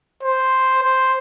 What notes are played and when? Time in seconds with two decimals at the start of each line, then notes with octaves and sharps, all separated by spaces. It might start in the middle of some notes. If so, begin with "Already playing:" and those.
0.23 C5
0.83 C5